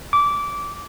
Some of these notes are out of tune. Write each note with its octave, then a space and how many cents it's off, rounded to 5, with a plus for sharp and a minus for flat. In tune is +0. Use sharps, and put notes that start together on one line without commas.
D6 -20